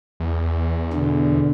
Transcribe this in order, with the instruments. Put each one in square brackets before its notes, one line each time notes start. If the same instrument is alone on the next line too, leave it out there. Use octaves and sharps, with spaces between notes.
[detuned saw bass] E2
[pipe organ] B2 D3